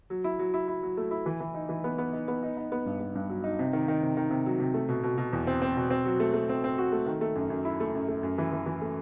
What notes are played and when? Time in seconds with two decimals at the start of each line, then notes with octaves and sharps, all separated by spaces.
0.10 F#3
0.24 E4
0.39 F#3
0.54 E4
0.68 E4
0.83 F#3
0.97 A3
1.11 E4
1.26 E3
1.40 E3
1.54 D#4
1.69 E3
1.84 B3
1.98 B3
2.13 D#4
2.28 B3
2.43 D#4
2.57 D#4
2.72 B3
2.86 G2
3.00 B3
3.15 G2
3.29 F#3
3.44 D#4
3.59 C3
3.73 D#3
3.88 D#3
4.03 C3
4.17 D#3
4.30 C3
4.46 F#3
4.59 C3
4.74 A3
4.89 B2
5.03 B2
5.18 B2
5.33 E2
5.47 C4
5.62 C4
5.76 B2
5.90 C4
6.06 F#3
6.20 A3
6.34 A3
6.49 C4
6.64 C4
6.78 F#4
6.92 A3
7.06 D#3
7.21 A3
7.35 F#2
7.50 F#2
7.65 E4
7.80 A3
7.95 F#2
8.08 A3
8.23 F#2
8.38 E3
8.53 E3
8.66 E3
8.82 A3